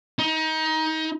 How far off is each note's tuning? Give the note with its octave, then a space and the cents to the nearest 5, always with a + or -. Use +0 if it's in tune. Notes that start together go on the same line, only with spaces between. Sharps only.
D#4 +25